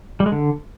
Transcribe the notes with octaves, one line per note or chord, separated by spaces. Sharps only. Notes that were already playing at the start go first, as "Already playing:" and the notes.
G3
G#3
D3